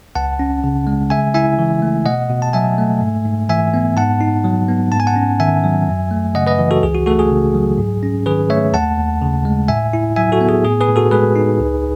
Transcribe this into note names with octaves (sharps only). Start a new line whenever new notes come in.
C#2 F#5 A5
C#4
C#3
G#3
C#3 E5 G#5
E4 E5 G#5
E3
A3
B2 D#5 F#5
B2
A5
F#3 E5 G#5
A3
G#2
G#2
E3 E5 G#5
B3
G#2 F#5 A5
D#4
F#3
B3
G#2 A5
G#5
F#5 A5
C#4
D#3 E5 G#5
F#3
F#2
A3
C#3 D#5 F#5
B4 D#5
E3
F#4 A4
C#2 G#4
F#4
A3 F#4 A4
G#4
C#3
F#3
G#2
C#4
D#3 G#4 B4
A3 C#5 E5
D#2 F#5 A5
D#2
C#3
G#3
A2 E5 G#5
E4
F#3 E5 G#5
F#4 A4
B3
G#4
A2 G#4
G#4 B4
A2
F#4 A4
G#3 G#4 B4
D#4
C#2